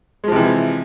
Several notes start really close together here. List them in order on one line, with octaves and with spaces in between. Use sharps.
G#3 F3 C3 E3